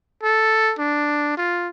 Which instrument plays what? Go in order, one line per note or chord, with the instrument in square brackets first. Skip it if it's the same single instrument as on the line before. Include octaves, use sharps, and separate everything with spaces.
[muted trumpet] A4
D4
F4